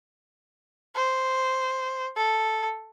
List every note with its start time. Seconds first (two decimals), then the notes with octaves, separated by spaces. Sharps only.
0.95 C5
2.16 A4